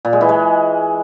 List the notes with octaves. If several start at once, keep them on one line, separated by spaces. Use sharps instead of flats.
A#2
G#3
E3
G#3